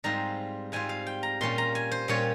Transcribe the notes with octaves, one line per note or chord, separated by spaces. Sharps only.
G#2 G3 C4 F4 A#5
G#2 G3 C4 F4 G#5
F5
G5
A#5
A#2 G3 C#4 F4 C6
A#5
G#5
C5
A#2 G3 C#4 F4 C#5